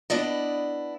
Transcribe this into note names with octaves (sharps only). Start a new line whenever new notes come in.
B3 D4 E4 D5 D#5